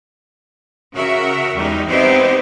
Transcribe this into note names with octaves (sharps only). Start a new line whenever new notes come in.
C#3 F#4 A#4 E5
E2 G3 G#3 D#4
B3 C4 D#4 E4 G4 C5